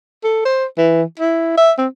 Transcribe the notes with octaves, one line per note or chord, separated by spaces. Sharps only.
A4
C5
E3
E4
E5
C4